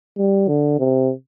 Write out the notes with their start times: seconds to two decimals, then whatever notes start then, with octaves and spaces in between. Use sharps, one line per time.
0.18 G3
0.48 D3
0.79 C3